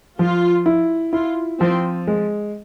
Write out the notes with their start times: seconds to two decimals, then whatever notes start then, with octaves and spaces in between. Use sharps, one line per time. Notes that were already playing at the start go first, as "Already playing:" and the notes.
0.19 F3 F4
0.66 E4
1.13 E4 F4
1.60 F3 C4
2.07 G#3